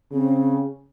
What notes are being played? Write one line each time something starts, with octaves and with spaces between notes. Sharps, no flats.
C#3 C4